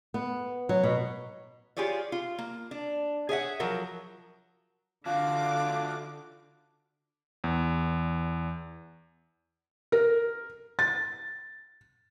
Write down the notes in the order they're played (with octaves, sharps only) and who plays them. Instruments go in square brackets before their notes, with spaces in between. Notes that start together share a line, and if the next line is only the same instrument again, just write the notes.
[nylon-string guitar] B3
F#3
B2
[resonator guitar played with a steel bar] F4 G4 G#4 C#5 D5
F4
A#3
D4
G#4 C#5 E5 F#5
F3 F#3 A#4
[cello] D3 [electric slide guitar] D4 F4 F#4 [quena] F5 [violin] D6
[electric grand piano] E2
[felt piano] A#4
A6